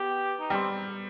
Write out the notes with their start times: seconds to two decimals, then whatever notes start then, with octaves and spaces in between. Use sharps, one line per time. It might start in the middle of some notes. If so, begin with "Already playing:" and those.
Already playing: B3 G4
0.40 D#4
0.50 G3 C4